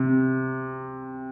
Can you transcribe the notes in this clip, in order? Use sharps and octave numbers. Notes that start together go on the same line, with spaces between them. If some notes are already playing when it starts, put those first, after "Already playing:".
Already playing: C3